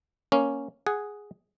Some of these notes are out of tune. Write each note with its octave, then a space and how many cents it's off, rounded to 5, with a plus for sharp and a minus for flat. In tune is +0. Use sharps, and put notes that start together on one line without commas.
A#3 +0 C#4 +0
G#4 +0 F#5 +0